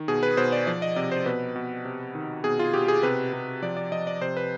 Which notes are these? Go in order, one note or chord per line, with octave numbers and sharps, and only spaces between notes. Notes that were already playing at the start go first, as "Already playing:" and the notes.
Already playing: D#3
B2 G#4
B4
B2 C5
D5
F3 D5
D#5
C3 D5
C5
B2 B4
B2
C3
D#3
B2 G#4
F4
B2 G4
G#4
C3 B4
C3
F3 D5
D5
F3 D#5
D5
C3 C5
B4